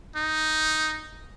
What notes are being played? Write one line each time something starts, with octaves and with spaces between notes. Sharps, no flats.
D#4